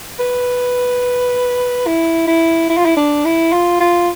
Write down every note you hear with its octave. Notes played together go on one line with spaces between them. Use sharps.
B4
E4
E4
E4
F4
E4
D4
E4
F4
F4